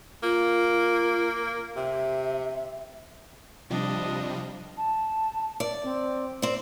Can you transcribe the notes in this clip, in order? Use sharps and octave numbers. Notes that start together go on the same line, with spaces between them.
A#3 F4
C3 E5
C3 F3 G3 D4 D#5
A5
D5
C4
C4 D5